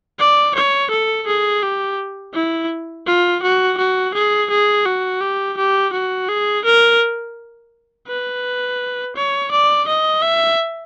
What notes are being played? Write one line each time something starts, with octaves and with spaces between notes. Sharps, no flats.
D5
C#5
A4
G#4
G4
E4
F4
F#4
F#4
G#4
G#4
F#4
G4
G4
F#4
G#4
A#4
B4
C#5
D5
D#5
E5